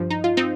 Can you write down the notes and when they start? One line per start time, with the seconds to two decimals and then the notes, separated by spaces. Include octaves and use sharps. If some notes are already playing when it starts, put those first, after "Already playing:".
Already playing: G2 F3
0.10 D#4
0.24 F4
0.37 C4 D#4